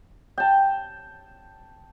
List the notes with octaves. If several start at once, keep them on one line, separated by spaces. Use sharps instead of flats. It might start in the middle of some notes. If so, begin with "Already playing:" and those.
G5 A5